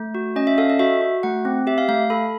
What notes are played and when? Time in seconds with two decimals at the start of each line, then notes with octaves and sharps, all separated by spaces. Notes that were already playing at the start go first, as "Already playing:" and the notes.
Already playing: A3
0.15 F#4
0.36 C#4 D#5
0.47 E5
0.58 A4 F5
0.70 D#5
0.79 F#4 E5
1.01 F#4
1.23 A3 F#5
1.45 C4
1.67 G4 E5
1.78 F5
1.89 A3 F5
2.10 A4 B5